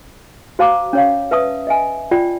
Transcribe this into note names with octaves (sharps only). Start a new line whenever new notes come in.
F#4 C5 F5 A5 A#5 D6
C#4 C#5 F5
B4 E5 A5 D#6
D#5 E5 G#5
F4 D5 G5